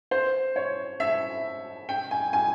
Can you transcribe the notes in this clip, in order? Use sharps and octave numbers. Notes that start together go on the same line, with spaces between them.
C5
C#5
E5
G5
G#5
G#5